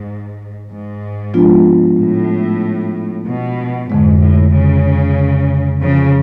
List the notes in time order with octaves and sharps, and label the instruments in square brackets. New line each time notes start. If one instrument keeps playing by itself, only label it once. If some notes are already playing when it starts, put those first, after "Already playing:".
Already playing: [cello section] G#2
G#2
[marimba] F3 G#3 B3 D4 F4
[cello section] A2
B2
[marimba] F2 D3 G#3 [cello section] G#2
[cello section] A2
C#3
C#3 F3